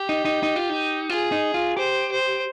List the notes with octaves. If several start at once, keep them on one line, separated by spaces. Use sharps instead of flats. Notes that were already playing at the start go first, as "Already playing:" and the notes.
Already playing: G4
D#4
D#4
D#4
F4
D#4
F4 G#4
D#4
F4
G4 C5
C5